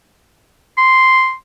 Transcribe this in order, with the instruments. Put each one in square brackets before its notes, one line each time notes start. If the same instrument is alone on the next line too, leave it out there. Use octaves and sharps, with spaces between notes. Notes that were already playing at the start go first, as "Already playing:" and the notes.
[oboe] C6